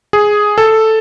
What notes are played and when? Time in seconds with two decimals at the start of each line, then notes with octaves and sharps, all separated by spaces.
0.13 G#4
0.58 A4